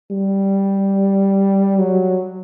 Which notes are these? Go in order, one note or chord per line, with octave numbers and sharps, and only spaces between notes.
G3
F#3